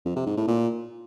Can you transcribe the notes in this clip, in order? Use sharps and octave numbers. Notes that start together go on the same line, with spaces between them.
F2
C3
G#2
A2
A#2